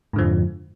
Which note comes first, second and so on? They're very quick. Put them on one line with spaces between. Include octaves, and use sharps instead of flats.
G#2 D3 F3 F2